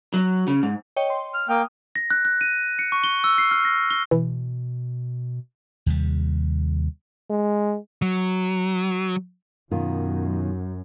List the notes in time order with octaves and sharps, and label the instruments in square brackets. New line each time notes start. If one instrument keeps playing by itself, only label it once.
[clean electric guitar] F#3
C#3
G#2
[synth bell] C#5 D#5 G5
C6
[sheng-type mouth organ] F6
[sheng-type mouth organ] A#3 G5 [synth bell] D#6 F6
[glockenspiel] A#6
F#6
F#6
D#7
C#7
C#6
G7
E6
C7
F6
A#6
G7
[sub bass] B2 [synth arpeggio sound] E3
[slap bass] D#2 C3 G3
[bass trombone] G#3
[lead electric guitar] F#3
[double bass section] F#2 [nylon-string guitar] B2 D#3 F4